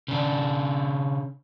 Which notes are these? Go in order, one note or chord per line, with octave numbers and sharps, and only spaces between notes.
C#3 D4